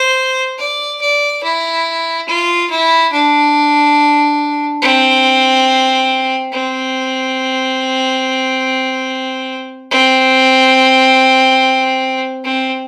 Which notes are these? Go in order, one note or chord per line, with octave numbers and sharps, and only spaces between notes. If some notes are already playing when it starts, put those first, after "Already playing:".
Already playing: C5
D5
D5
E4
F4
E4
D4
C4
C4
C4
C4